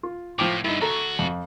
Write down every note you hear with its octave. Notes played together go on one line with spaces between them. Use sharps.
F4
A2 F3 G5 D6
G2 D3 D#4 E4
D2 F#4 A4 A#5
F2